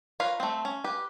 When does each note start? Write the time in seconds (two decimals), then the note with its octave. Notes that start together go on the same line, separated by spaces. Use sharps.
0.20 F4 A#4 B4 C#5 F5
0.40 A3 C4
0.65 C#4
0.84 G4 B4